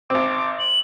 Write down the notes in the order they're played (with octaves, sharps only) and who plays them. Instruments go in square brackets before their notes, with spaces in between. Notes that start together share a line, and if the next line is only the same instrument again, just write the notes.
[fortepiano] G#1 C4 [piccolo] D6
[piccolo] F#7